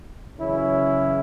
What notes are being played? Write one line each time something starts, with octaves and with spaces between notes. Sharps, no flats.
F#2 C#3 E3 C#4 E4